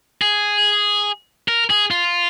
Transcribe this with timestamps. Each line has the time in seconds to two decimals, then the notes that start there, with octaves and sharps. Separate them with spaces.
0.22 G#4
1.48 A#4
1.70 G#4
1.91 F4